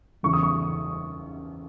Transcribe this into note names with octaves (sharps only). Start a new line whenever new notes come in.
E2 C#3 E3 C#6
D#6
C#6